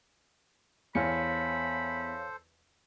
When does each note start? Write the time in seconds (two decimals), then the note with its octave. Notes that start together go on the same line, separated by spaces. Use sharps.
0.95 E2 A4 C5 C#5 F5 B5 C#7